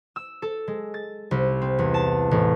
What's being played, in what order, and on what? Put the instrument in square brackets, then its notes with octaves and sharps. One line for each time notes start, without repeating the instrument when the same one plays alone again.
[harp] E6
A4
G#3
A6
C2
C4
E2
A5
A1